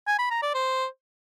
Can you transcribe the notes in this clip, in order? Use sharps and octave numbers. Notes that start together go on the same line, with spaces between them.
G#5
B5
A#5
D5
C5